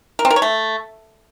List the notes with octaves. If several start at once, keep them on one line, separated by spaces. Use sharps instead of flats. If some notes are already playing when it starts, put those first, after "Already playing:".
A#4
C4
A#4
C#5
A3